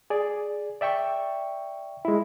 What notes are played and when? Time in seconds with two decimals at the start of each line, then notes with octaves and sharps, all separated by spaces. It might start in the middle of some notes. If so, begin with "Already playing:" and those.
0.10 G#4 D5
0.81 D5 E5 G5 C#6
2.05 G#3 E4